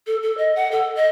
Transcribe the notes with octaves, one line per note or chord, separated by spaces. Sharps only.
A4
A4
D#5
F#5
A4
D#5